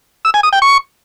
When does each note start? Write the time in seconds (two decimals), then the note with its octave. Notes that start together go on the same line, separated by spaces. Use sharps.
0.25 E6
0.34 G#5
0.43 D#6
0.53 G5
0.62 C#6